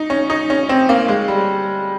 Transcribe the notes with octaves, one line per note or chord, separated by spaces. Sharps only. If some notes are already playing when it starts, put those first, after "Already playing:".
Already playing: D#4
C#4
D#4
C#4
C4
A#3
G#3
G3